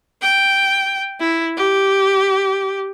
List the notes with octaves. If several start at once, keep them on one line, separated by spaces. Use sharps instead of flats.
G5
E4
G4